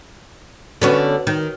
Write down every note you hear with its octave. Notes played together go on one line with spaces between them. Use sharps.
D3 B3 C#4 F#4 B4 C#5
D#3